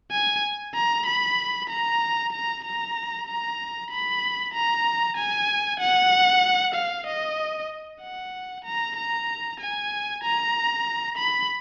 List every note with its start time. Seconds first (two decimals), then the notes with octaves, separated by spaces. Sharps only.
0.11 G#5
0.74 A#5
1.06 B5
1.69 A#5
2.32 A#5
2.64 A#5
3.27 A#5
3.90 B5
4.54 A#5
5.17 G#5
5.80 F#5
6.75 F5
7.06 D#5
8.01 F#5
8.65 A#5
8.96 A#5
9.60 G#5
10.23 A#5
11.17 B5